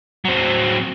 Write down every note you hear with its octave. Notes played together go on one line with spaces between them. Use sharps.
F#3 C4